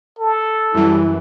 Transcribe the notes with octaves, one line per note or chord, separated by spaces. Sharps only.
A4
F#2 E3 G3 E4